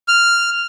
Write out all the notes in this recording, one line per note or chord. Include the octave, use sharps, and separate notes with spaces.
F6